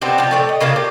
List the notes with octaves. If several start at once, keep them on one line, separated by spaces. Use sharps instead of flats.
B3 C4 D4 G4
F3 G4
A2 A3 D5 G5
D#5
C#3 A#3 D4 F4
G4